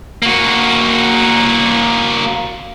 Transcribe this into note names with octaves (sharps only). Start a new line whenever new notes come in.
A#3 F#4